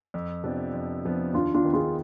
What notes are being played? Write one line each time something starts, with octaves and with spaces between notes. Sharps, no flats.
F2
C3 F3 B3 D4
F2
C3 F3 B3 D4
D#2 D4 F4
D4 F4
D#3 B3
F4 G#4